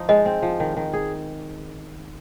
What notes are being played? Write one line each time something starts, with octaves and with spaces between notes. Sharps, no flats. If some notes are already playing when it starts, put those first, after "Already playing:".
Already playing: F3 D#4
G#3 D#5
C4
F3
D#3
D#3
G#4